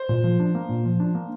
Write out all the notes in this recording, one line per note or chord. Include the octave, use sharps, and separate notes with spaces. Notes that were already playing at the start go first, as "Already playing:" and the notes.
Already playing: C5
A#2
F3
D4
A#3
A#2
F3
D4
A#3